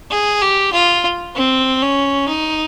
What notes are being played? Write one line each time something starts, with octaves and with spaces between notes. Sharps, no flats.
G#4
G4
F4
C4
C#4
D#4